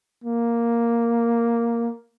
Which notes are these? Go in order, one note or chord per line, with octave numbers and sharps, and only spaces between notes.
A#3